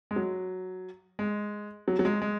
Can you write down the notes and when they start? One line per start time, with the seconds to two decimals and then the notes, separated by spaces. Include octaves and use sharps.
0.11 G#3
0.16 F#3
1.19 G#3
1.88 F#3
1.99 F#3
2.05 G#3
2.22 G#3